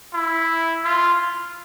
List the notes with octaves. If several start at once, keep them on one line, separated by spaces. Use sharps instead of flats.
E4
F4